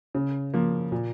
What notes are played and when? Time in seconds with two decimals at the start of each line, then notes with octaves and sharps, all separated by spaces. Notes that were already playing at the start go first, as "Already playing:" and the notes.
0.15 C#3
0.54 F3 A#3
0.92 A#2